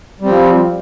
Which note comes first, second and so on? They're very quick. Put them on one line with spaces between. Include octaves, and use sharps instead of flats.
G3 C4 F3